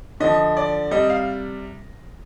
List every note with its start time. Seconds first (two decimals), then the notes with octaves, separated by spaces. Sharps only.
0.20 D3 F3 D#5
0.57 D5
0.91 C3 G3 D#5
1.10 F5